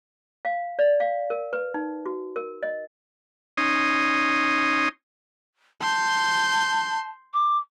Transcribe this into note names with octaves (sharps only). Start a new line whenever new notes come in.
F5
D5
F5
A#4
B4
D#4
F#4
A#4
D#5
C#4 D#4 C6 D#6
A5 C6 G6
D6